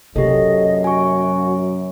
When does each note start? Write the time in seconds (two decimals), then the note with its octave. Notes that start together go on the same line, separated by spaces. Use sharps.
0.16 F#2 C3 A#3 G4 A4 D#5
0.84 F#4 G#5 C#6